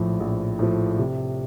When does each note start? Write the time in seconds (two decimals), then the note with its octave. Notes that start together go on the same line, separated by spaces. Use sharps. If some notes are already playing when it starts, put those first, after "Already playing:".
Already playing: A#1 A2 F3
0.20 A#1
0.59 A2 F3
0.98 C3